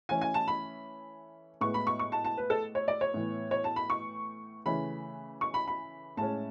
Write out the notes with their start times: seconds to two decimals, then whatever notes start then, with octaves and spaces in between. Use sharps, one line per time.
0.09 E3 A3 C#4 G#5
0.21 G#5
0.34 A5
0.48 B5
1.61 A2 G#3 B3 C#6
1.74 B5
1.87 C#6
1.99 C#6
2.12 A5
2.25 A5
2.37 B4
2.50 A4
2.75 C#5
2.88 D5
3.01 C#5
3.14 A2 E3 B3
3.51 C#5
3.64 A5
3.76 B5
3.90 C#6
4.66 C#3 E3 A3 C#4 B5
5.41 C#6
5.54 B5
5.67 B5
6.17 A2 G#3 C#4 A5